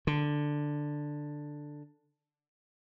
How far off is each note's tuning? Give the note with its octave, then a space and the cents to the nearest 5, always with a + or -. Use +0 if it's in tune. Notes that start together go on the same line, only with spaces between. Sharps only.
D3 +5